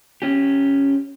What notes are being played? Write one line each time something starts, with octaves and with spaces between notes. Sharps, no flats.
C#4 G4